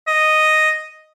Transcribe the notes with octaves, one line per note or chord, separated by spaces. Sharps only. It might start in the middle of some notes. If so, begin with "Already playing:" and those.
D#5